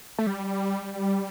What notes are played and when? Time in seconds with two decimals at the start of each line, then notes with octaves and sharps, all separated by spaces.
0.18 A3
0.27 G3